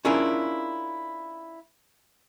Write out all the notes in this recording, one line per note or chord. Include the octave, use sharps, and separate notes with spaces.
C#4 D4 E4 F4 G#4 A#4